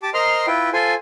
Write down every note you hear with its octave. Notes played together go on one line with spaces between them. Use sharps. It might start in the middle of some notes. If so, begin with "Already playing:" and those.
G4 A5 D6
A#4 C5 D#5 A#5 C6 F6
E4 F4 B4 G5
F4 A4 C5 G#5